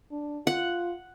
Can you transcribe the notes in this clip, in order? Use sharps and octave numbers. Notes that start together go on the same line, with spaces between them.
D4
F4 F#5